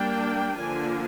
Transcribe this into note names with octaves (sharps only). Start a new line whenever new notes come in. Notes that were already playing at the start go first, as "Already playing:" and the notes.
Already playing: G3 A#3 D4 G5
D3 F3 A#3 D4 G#5